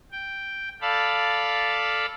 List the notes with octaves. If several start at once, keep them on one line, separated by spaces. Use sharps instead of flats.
G5
A4 D5 F5 A5 B5